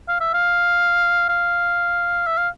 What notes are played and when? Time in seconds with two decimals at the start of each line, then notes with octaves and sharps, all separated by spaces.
0.08 F5
0.20 E5
0.33 F5
1.29 F5
2.27 E5
2.37 F5